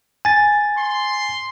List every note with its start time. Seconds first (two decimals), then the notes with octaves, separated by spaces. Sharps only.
0.25 G#5 A6
0.77 C6